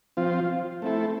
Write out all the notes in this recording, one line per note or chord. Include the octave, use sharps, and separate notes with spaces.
F3 C4 F4
A3 C4 E4 A4